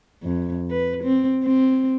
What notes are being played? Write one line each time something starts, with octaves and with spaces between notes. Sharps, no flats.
F2
B4
C4
C4